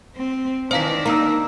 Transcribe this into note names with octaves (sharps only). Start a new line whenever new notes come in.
C4
D#3 E3 D4 D#4 C5 F5 B6
A#3 D#4 A#5 E6